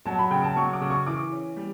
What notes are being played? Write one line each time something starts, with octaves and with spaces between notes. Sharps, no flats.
F#3 A5
B5
C#3 G5
A5
F#3 C#6
D6
C#3
C#6
E3 D6
C#4
G3